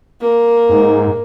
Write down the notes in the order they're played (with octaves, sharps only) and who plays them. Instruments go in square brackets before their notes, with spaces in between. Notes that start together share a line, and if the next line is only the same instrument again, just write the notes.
[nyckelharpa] A#3
[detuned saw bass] G#2